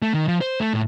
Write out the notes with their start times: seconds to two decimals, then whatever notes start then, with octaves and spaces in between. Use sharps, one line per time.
0.02 A3
0.14 D#3
0.28 F3
0.41 C5
0.60 A3
0.74 A2